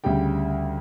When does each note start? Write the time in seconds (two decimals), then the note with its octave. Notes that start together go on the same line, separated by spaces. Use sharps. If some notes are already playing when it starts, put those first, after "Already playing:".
0.04 D2 C#3 G3 G5